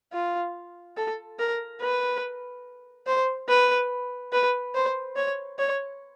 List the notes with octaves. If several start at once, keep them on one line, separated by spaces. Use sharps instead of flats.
F4
A4
A#4
B4
C5
B4
B4
C5
C#5
C#5